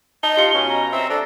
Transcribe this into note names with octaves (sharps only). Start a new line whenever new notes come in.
D#4 D#5 A5 G7
F4 G4 D#5 C#7
B2 C#4
A#5
C4 E5
D4 A4